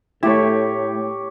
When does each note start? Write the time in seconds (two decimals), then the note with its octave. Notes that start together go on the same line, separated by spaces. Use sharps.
0.23 A2 A3 E4 G4 C#5